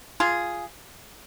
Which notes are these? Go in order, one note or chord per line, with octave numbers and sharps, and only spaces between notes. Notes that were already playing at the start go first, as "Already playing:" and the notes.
F4 G#4